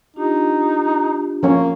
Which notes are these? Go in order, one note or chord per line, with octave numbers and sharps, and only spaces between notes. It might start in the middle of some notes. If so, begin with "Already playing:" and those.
D4 D#4 F4 G4
F3 A#3 C#4 C#5